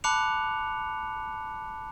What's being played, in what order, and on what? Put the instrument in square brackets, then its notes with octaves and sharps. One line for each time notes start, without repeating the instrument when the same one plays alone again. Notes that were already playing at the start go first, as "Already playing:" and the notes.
[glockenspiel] A5 B5 D6 F#6 C#7 F7